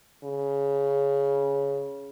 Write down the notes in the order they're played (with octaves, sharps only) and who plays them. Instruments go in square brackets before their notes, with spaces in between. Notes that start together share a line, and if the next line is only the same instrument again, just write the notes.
[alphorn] C#3